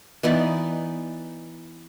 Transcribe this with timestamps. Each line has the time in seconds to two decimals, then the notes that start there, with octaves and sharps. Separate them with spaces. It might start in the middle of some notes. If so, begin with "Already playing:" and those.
0.23 E3 B3 D#4 D5